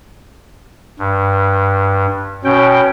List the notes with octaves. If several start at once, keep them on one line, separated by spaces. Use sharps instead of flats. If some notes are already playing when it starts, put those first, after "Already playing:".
G2
B2 C#4 G5